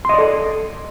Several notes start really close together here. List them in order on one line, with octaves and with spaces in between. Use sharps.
C6 D#5 D5 A4